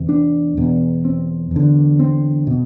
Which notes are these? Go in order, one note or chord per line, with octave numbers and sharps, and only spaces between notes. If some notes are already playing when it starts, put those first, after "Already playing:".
Already playing: E2 C3
D4
E2 B2
C4
E2 D3
C4
B2